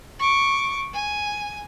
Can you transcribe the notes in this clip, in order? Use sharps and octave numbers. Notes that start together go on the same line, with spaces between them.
C#6 D6
G#5